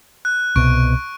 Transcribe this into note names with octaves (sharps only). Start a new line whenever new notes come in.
F#6
C2 B2 C#6 D7